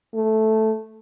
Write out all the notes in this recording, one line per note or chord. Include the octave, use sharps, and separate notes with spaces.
A3